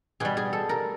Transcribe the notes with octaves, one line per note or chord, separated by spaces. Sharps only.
B2 G3 G#4
G#4
A4
A#4